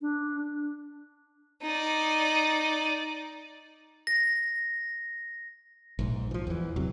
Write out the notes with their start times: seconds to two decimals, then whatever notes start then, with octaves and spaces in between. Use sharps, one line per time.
0.01 D4
1.63 D#4 D5
4.07 A#6
5.99 A#1 G#2
6.31 E3 F3
6.47 E2 E3
6.76 E2 C3 F#3